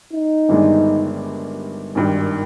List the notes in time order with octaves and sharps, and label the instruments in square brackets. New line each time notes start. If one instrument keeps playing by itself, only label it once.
[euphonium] D#4
[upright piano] G1 G2 D#3 G#3 D4
G#1 G2 D#3